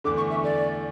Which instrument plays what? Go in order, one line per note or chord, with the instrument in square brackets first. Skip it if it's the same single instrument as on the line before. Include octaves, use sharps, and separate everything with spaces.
[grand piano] E2 D3 A3 [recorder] D6
[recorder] C#6
E5
[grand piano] A3 [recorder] D5